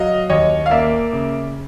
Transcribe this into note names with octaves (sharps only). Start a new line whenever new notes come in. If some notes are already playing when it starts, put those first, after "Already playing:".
Already playing: F#3 D#5 F5
D#2 C#5 D#5
F5
A#3 D5 E5
C#3